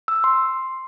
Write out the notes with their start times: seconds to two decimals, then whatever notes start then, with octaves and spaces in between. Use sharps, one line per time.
0.08 E6
0.24 C6